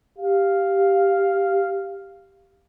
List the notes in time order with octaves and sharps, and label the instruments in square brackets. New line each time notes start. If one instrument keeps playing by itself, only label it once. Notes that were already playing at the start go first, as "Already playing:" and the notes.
[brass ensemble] G4 F5